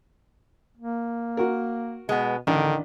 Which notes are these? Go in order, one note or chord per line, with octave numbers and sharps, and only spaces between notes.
A#3
F#4 A#4
B2 G#3 B3
A1 D3 D#3 D4